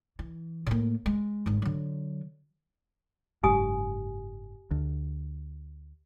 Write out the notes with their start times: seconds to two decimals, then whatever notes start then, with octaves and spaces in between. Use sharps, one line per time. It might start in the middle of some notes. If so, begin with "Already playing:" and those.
0.19 E3
0.66 A2 A#3
1.06 G#3
1.46 G#1 G#2
1.62 D3 F#3
3.43 F#1 G#2 G4 G#5 D#6
4.71 D2